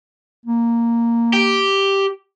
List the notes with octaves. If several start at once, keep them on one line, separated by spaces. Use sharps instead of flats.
A#3
G4